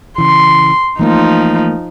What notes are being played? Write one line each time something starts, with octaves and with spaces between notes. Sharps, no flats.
C#3 E3 C6
E3 F3 A3 A#3 D#4